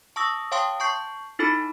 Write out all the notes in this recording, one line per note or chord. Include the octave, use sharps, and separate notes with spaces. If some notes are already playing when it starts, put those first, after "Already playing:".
A5 C#6 D#6 E6 A#6
C#5 F5 G5 A5 C6 D#6
A5 C#6 G6 C7
D#4 E4 A4 B5